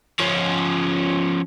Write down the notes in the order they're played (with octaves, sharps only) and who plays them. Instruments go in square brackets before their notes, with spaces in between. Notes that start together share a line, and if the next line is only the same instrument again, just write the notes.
[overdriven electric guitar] F3 C#4